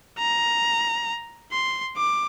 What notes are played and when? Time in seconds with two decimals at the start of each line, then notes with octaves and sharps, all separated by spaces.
0.19 A#5
1.52 C6
1.97 D6